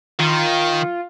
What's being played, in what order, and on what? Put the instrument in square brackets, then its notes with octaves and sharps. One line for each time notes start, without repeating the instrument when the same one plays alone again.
[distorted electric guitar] D#3 [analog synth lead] F4